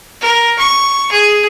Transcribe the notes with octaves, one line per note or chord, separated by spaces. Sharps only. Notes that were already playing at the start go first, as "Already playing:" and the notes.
A#4
C#6
G#4